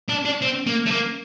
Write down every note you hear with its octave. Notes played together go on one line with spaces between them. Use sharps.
D4
D4
C4
A#3
A3
A#3